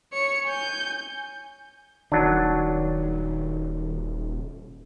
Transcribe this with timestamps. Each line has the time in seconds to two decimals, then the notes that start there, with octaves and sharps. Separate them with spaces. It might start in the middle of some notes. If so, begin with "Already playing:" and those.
0.13 C#5 C#7
0.46 G#5 G6
2.12 D#1 D#3 F#3 D4